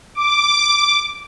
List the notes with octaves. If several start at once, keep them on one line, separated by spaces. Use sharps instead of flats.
D6